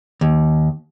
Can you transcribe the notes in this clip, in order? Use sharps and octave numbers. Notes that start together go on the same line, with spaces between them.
D#2